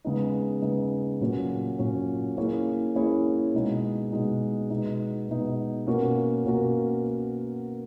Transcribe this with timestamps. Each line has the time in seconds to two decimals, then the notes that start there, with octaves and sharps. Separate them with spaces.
0.05 C#3 G#3 B3 D#4
0.62 C#3 G#3 B3 D#4
1.21 A#2 F#3 C#4
1.79 A#2 F#3 C#4
2.37 A#3 C#4 E4 G#4 C#5
2.95 A#3 C#4 E4 G#4 C#5
3.54 B2 G#3 D#4
4.12 B2 G#3 D#4
4.70 B2 G#3 B3 D#4
5.28 B2 G#3 B3 D#4
5.87 B2 A#3 C#4 F#4 A#4
6.45 B2 A#3 C#4 F#4 A#4